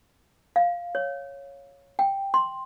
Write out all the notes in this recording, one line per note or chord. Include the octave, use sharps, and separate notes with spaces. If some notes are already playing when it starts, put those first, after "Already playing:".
F5
C#5
G5
C6